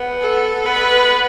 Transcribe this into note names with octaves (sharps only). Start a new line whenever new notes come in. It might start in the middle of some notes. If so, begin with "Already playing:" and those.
Already playing: B3
A4
B3 B4